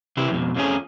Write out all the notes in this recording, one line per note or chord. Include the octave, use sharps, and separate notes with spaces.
C3 E3 E4 G4
F2 B2
F2 F3 G#3 A3 C#4 G#4